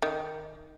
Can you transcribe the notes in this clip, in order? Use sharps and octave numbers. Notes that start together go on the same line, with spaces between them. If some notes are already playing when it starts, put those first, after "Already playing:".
D#3